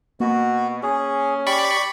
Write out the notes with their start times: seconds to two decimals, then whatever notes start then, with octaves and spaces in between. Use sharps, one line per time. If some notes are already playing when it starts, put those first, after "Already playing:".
0.20 B2 A#3 F#4
0.83 C#4 G#4
1.47 G4 D5 B5 C#6